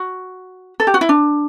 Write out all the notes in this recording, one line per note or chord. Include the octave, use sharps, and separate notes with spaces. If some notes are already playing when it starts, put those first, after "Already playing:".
Already playing: F#4
A4
G4
F#4
E4
D4